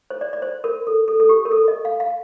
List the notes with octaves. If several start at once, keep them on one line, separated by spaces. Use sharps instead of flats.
C5
D5
D5
C5
A#4
A4
A4
A4
G4
A#4
A4
D#5
F5
F5